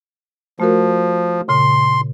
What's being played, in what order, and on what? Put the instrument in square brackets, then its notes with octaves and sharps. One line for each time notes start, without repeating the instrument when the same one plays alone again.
[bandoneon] F3 [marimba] A3 F#4 A#4
[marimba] A#2 C#3 [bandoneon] C6